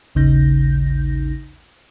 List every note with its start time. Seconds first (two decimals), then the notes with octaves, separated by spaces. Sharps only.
0.15 A1 D#2 C#3 D#4 G6 A#6